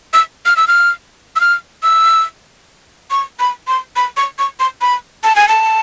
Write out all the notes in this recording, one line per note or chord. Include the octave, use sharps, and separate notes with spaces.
E6
F6
E6
F6
E6
F6
E6
C#6
B5
C6
B5
C#6
C#6
C6
B5
A5
G#5
A5